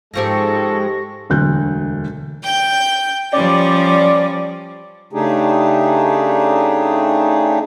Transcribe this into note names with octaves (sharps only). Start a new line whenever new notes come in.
G#2 F3 G#3 C4 G4 A4 C#6 A#6
E1 D2 F#3 F#6 G6
G5 G6
F3 G3 C#4 D5
C#3 A3 D4 D#4 G4 G#4